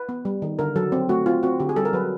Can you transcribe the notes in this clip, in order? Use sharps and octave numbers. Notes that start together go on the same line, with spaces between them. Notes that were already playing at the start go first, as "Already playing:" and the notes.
Already playing: B4
B3
G3
D#3
D3 A#4
F#3 A4
C4
A3 F#4
C4 F4
C4 F#4
D3 G4
G#4
G3 A4
A#4
F#3 B4